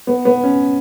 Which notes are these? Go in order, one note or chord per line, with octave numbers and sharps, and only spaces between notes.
B3
B3
C#4